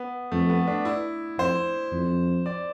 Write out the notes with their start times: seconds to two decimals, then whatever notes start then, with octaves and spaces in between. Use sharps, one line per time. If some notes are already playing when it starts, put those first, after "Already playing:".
Already playing: B3
0.32 F2 A3
0.50 B3
0.67 D4
0.85 E4
1.39 F2 C5
1.92 F2
2.46 D5